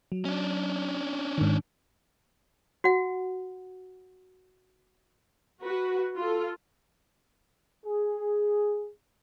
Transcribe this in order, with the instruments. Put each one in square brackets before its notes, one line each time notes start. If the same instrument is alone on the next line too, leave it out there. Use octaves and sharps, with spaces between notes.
[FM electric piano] F#3
[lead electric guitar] C#4 D4
[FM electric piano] G#2 D#3
[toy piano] F#4 F#5
[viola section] F#4 B4
F4 A4
[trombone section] G#4